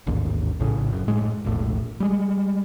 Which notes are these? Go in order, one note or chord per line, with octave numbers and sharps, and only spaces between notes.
A1 D#2 G#2
A#1 A2 C#3
F#1 F#2
A2 G#3
E1 A#1 A2
G3 G#3